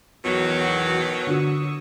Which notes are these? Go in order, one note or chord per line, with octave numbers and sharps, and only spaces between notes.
E2 B2 D#3 F#3 F#4
D3 F#4 C#6 D#6 E6